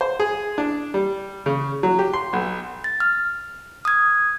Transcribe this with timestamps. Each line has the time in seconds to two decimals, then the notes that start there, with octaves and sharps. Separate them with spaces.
0.01 C5
0.20 G#4
0.58 D4
0.94 G3
1.46 C#3
1.83 F#3
1.99 G4
2.14 C6
2.33 B1
2.84 A6
3.00 F6
3.85 D#6 G#6